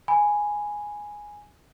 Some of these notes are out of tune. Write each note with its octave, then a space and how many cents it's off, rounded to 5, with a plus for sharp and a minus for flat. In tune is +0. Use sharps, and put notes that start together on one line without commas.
G#5 +0 B5 +0